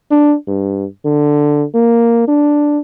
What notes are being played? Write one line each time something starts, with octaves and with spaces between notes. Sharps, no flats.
D4
G2
D3
A#3
D4